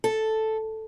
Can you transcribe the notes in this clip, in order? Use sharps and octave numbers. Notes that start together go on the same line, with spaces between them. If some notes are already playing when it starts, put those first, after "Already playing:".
A4